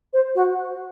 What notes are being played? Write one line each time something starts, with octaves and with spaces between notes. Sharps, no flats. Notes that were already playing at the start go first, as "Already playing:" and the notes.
C5
F#4